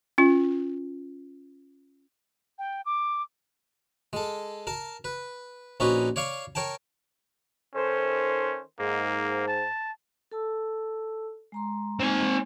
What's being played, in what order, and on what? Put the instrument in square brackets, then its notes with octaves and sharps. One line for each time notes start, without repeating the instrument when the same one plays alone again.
[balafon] C#4 F4
[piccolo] G5
D6
[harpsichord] G#3 A4
A#4 A5
B4
A#1 C#4 D#4 F#4 B4
C#5 D5 F5 C#6
A#4 C#5 G5 A5
[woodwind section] D#3 A4 C5 [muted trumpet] C#4
[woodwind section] G#2 [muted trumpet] A#3
[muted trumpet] A5
[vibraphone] A4 A5 E6
G#3 A#5 C6
[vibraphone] G#3 A#3 D#4 [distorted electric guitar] C4 G#5